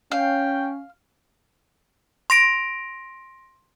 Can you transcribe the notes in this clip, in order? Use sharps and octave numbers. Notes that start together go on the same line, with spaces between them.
C#4 F5 G5
C6 A#6 D7